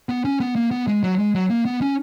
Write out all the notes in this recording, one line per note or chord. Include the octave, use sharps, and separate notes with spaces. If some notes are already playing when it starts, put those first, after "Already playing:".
B3
C#4
B3
A#3
B3
G#3
F#3
G#3
F#3
A#3
B3
C#4